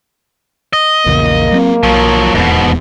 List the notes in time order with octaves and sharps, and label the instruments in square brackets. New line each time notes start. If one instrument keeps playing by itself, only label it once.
[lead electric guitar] D#5
[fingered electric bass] A#1 E2 C#3 [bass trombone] A#3
[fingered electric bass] F#3 A3 C4
[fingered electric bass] B1 [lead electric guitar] F3 F#3
[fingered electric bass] D#1 E2 [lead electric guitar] G#2 B2